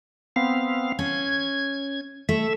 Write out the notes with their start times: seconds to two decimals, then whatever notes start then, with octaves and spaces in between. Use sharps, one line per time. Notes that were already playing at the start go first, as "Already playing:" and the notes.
0.36 B3 C4 F5
0.99 C#4 G#6
2.29 A3 E5